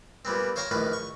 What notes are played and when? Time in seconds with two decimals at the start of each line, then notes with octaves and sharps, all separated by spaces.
0.25 A#2 G3 B3 C4
0.56 C5 C#5 F5 G5 A#5 C6
0.71 A#1 A2 D#3 B4 F5
0.93 C#6